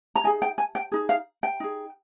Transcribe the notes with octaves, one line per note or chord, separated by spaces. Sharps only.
A#5
D#4 G#4 G#5
G5
G#5
G5
D#4 G#4
F5
G5
D#4 G#4